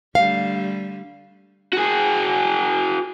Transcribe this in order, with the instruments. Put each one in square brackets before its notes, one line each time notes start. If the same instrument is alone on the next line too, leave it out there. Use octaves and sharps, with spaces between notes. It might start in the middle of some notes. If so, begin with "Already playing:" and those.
[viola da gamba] D3 G3 A3 [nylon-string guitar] F5
[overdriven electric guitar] F#4 G#4